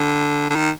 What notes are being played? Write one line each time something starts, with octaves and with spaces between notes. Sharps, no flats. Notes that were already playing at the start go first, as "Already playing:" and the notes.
Already playing: D3
D3
D#3